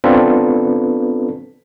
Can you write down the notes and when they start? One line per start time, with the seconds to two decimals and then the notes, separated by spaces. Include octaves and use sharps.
0.04 B3 C4 D4 F4 A4 B4